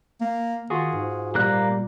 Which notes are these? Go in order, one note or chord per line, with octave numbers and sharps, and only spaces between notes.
A#3
D#3 F4 F#4 G#4
G#2
A#2 G3 A#3 F#6